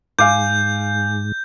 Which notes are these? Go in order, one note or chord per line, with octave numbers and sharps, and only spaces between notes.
G#2 F5 G#5 D6 G6